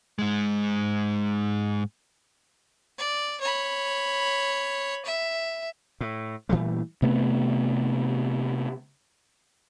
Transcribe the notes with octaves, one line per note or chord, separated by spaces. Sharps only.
G#2 G#3
D5
C#5 B5
E5
A2
A#2 E3 G3 A3
C3 A3 B3